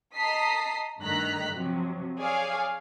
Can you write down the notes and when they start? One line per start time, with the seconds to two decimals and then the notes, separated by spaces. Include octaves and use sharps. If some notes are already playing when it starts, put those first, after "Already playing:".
0.16 D#5 A5 A#5 D#6 B6 C7
1.00 G2 D#3 A3 A#5 F#6 B6
1.52 C3 F3 F#3
2.18 G#4 C#5 D5 F5 G#5